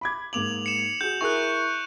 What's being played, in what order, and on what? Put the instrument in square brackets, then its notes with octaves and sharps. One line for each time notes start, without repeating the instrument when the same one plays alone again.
[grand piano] B5 D6 G#6
[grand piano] G#2 A#3 D6 [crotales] F7 F#7
[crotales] C#7 E7
[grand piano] F#4 G#4 [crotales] G6
[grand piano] E4 G#4 A#4 [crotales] C#6 F#6